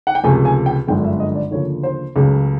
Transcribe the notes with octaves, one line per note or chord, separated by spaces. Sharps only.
F#5
G5
C#2 C3 F3 A3 G#5
G#5
G5
G1 F#2 D3 F3 G#3 G5
E5
D#5
D5
D2 C#3 F3 A#3 C#5
C5
C#2 C#3 F#3 A3